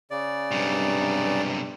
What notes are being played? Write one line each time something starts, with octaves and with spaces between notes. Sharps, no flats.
C#3 D5
B1 G2 C3